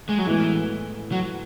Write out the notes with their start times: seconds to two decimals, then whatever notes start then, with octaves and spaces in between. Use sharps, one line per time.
0.09 G#3
0.18 F#3
0.26 A2 E3 G#3 B3
1.12 F#3